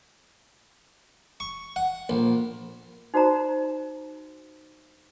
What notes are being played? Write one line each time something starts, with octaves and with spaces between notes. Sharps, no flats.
C#6
F#5
A#1
D#4 F#4 C5 D5 A#5